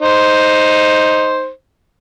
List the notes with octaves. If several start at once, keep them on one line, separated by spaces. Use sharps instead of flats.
D#4 C5